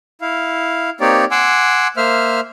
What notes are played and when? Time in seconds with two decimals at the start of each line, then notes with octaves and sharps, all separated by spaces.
0.21 E4 F5
1.01 A#3 C4 D#4 G4 C#5 D5
1.31 F#5 G#5 C6 D6 E6
1.97 A#3 C5 E5 F6